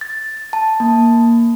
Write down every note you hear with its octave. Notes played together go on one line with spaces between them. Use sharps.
A6
A5
A#3